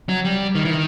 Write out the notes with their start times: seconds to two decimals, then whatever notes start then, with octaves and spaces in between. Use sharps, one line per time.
0.09 F#3
0.25 G3
0.55 D#3
0.65 E3
0.71 D#3